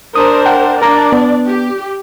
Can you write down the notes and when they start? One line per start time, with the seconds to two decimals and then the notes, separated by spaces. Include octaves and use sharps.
0.15 D4 A#4 C5 D#6
0.46 F#5 G5
0.82 D4 A#4 D5 A#5 D6
1.12 B3
1.47 G4